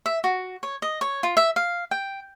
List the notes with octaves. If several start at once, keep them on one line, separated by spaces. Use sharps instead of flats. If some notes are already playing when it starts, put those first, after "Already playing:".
E5
F#4
C#5
D#5
C#5
F4
E5
F5
G5